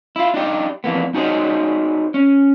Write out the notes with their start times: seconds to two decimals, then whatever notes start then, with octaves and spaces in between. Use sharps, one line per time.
0.16 E4 F4
0.34 D4 D#4 G4
0.84 F2 E3 A#3 B3
1.14 D#4 F#4 G#4 C5 C#5 D#5
2.14 C#4